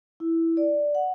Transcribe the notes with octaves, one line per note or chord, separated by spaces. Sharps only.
E4
D5
F#5